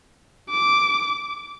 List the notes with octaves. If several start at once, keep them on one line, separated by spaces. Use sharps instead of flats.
D6